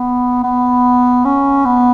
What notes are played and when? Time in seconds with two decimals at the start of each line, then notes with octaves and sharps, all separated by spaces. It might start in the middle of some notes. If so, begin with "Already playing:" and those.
Already playing: B3
0.43 B3
1.25 C#4
1.65 B3